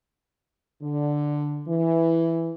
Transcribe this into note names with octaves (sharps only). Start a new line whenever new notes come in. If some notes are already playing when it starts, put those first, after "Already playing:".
D3
E3